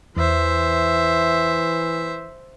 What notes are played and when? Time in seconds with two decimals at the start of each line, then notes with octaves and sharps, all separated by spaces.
0.17 E2 E3 C5 E5